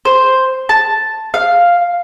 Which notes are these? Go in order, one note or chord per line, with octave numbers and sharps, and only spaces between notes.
C5
A5
F5